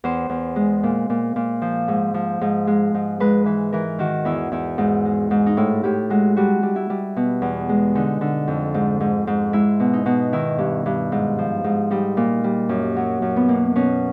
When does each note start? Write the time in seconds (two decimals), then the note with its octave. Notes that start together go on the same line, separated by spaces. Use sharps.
0.04 E2 C5
0.30 E2
0.56 G#3
0.83 A#2
1.10 A#2
1.36 A#2
1.62 F3
1.88 G#2
2.14 F3
2.41 G#2
2.67 G#3
2.94 G#2
3.20 G#3 B4
3.46 E3 B4
3.72 E3 A#4
3.99 D#3 F#4
4.25 E2 E4
4.52 E2 E4
4.78 G#2
5.05 G#3
5.31 G#2
5.46 D#4
5.57 A2 E4
5.83 A2 G4
6.10 G#3 F#4
6.37 G3 F#4
6.63 G3
6.76 E4
6.90 G3
7.17 B2
7.42 E2
7.69 G#3
7.95 D3 D#4
8.21 D3
8.48 F2
8.74 G#2
9.00 G#2
9.27 G#2
9.53 G#3 E4
9.80 B2
9.93 D#4
10.06 B2
10.33 D#3 E4
10.58 G2
10.86 G2
11.12 G#2
11.39 F3
11.64 G#2
11.91 G3 D#4
12.17 A#2
12.44 G3
12.69 F#2
12.96 F#3
13.22 F#2
13.36 B3
13.48 B2 A#3
13.76 B2 C#4